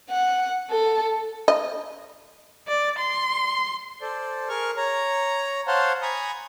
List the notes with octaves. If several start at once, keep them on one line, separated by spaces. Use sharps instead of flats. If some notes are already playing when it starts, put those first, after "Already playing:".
F#5
A4
D#5
D5
C6
A4 C5 D5
G#4 A#4 C#6 F6
C#5 A#5
C5 C#5 F5 F#5 A5 C6
G#5 A#5 B5 C#6 D#6